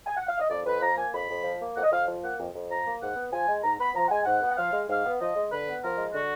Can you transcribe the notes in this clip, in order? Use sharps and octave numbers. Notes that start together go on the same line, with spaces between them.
G#5
F#5
F5
D#5
F2 D5
F2 B4
F3 A#5
A#3 G#5
F2 B5
F2
F3
A#3
F2 F#5
D#5
F2 F5
F3
A#3 F#5
F2
F2
F3 A#5
A#3
G#2 F#5
B3
F3 G#5
G#3
G#2 A#5
B3 B5
F3 A#5
F#5
G#3 G#5
G#2 F#5
B3
F#5
F3 F5
G#3
G#2 F5
B3
F3 D#5
G#3
D3 B4
B3
F3 A#4
G#3
D3 F#4